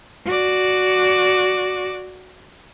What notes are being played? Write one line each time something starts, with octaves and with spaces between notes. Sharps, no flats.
F#4 D5